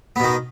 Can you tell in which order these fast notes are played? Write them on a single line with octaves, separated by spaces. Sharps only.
B3 B2 D#3